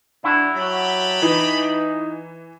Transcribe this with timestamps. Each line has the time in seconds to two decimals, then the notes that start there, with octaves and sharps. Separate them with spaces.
0.24 D4 E4 F#4
0.56 F#3 G4 A5 B5
1.22 E3 D#4